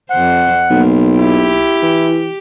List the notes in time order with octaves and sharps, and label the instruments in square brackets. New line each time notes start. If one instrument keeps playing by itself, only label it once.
[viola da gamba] F2 C5 [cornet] F#5
[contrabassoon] B1 [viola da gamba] A#3
[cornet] E4 [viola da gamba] G4
[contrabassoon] E3